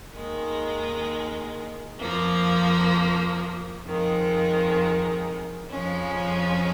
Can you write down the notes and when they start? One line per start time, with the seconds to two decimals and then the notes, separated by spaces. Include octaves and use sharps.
0.15 D#2 D#3 G#3
2.00 F2 F3 A#3
3.85 F2 D#3 G#3
5.70 F2 F3 G#3 C#4